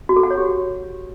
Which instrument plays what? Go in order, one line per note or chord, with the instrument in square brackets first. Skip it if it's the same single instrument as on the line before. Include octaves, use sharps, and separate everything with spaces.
[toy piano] F#4
A4
F#5
C#5
G4